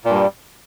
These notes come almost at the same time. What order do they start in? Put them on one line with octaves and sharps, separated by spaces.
A#2 G2 G3